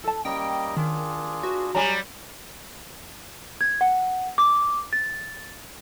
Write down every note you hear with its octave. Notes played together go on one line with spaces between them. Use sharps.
A4 A5
G3 A#3 C#4 D#5 G5
D#3 D4 F4 G#4
F#4 B4
F#3 G3 G#5 A#5
G#6
F#5
D6
A6